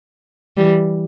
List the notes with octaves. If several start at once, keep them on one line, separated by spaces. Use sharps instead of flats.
E3 G3